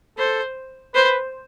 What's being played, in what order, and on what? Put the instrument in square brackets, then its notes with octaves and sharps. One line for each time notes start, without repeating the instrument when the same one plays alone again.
[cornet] A4 [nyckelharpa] C5
[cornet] B4 [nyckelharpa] C5